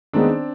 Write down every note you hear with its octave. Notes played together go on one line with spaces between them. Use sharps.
D#3 G#3 B3 C4 D4 D#4